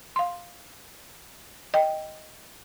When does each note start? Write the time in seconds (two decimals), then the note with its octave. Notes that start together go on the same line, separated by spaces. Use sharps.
0.16 F5 C6
1.74 D#5 G5